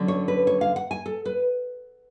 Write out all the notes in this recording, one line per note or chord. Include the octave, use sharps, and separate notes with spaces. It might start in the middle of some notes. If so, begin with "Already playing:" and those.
Already playing: D3 F#3 C#4
C#5
B4
C#5
F5
F#5
G#5
A4
B4